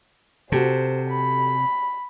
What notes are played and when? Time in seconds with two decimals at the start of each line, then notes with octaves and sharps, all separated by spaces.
0.52 C3 F#4 G4 A4 C5
1.10 B5